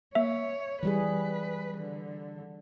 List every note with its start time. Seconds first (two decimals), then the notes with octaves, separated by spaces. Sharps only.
0.15 A#3 C#5 E5
0.83 E3 G3 G#4 B4
1.78 D3